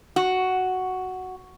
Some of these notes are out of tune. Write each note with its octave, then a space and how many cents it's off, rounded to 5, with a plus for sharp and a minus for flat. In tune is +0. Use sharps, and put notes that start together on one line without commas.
F#4 +5